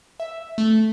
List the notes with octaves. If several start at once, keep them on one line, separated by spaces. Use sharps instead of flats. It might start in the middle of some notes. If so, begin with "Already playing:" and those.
E5
A3